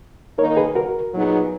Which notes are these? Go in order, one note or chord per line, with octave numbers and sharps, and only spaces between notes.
D#3 A#3 D#4 A#4 C#5
G#4 B4
F#4 A#4
A#2 F#3 B3 D#4 G#4